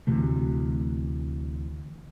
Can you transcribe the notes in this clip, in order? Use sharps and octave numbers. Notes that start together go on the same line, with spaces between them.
D2 C3 E3 A3